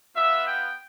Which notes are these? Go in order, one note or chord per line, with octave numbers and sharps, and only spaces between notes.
B3 F4 E5
G5